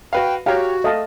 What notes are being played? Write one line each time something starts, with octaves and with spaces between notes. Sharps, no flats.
F#4 B4 F5 G5
F#4 G4 C#5 F5 G5 A#5
A3 D#5 F5 A5